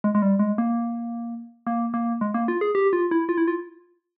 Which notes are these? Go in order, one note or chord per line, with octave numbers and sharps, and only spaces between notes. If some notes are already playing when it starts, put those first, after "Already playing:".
G#3
G#3
G3
G#3
A#3
A#3
A#3
G#3
A#3
F4
G#4
G4
F4
E4
F4
E4
F4